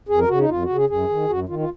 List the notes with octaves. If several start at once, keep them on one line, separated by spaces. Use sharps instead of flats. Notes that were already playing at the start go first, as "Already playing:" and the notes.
F2 G#4
A#4
C#3 F#4
D#4
F2 F4
F#4
C#3
G#4
F#2 G#4
D#3
F#2 F#4
D#3 F4
F4